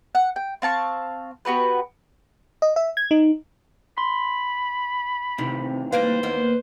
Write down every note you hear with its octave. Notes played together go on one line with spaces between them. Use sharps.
F#5
G5
C4 F5 A5 C#6
B3 F#4 G4 B4
D#5
E5
G#6
D#4
B5 C6
A2 C3 D#3 E3
G3 A#3 B4 C5 F5
D#2 A#3 B3